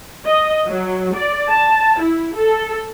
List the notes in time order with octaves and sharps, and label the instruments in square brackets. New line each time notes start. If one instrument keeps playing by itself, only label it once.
[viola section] D#5
F#3
D5
A5
E4
A4